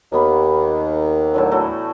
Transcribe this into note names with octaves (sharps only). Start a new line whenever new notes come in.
D#2 A#3 B3 B5
A2 D3 F#3
E3 A3 F#4